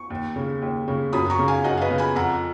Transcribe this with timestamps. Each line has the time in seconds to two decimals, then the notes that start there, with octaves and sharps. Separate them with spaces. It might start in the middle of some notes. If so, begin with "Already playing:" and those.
Already playing: C#6
0.10 D#2
0.36 C#3
0.62 D#2
0.88 C#3
1.13 F#2 B5 D#6
1.30 A#5 C#6
1.39 C#3
1.48 F5 G#5
1.64 F#2 D#5 F#5
1.77 F5
1.81 B4 D#5
1.90 C#3
1.98 G#5 B5
2.15 F2 F#5 A#5